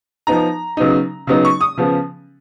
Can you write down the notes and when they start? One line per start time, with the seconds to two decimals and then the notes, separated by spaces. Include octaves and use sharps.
0.27 F3 B3 D#4 A#5
0.77 C#3 F#3 B3 D#4
1.27 C#3 F#3 B3 D#4
1.45 C#6
1.61 D#6
1.77 C#3 F3 B3